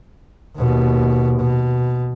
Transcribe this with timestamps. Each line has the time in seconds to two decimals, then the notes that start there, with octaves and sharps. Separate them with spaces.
0.58 D#2 B2
1.40 B2